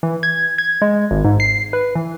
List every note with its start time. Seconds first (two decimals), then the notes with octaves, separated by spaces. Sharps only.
0.03 E3
0.23 G#6
0.58 G#6
0.82 G#3
1.11 G#1
1.24 G#2
1.40 C7
1.73 B4
1.95 E3